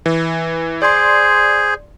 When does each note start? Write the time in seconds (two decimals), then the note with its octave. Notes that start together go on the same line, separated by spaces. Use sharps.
0.06 E3
0.82 G#4 C5 D5 C6